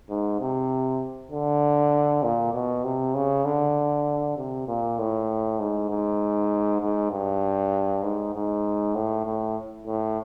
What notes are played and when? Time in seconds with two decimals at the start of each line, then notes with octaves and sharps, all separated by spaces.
0.10 G#2
0.40 C3
1.31 D3
2.23 A#2
2.54 B2
2.84 C3
3.15 C#3
3.45 D3
4.37 C3
4.68 A#2
4.99 A2
5.60 G#2
5.89 G#2
6.81 G#2
7.11 G2
8.03 G#2
8.34 G#2
8.95 A2
9.25 A2
9.87 A2